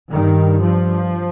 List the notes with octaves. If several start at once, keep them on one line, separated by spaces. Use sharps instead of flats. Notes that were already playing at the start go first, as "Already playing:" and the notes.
G2 D#3
F3